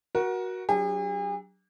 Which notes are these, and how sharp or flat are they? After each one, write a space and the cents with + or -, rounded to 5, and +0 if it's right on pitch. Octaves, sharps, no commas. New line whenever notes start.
F#4 +0 A#4 +30
F#3 +25 D4 +0 G#4 -45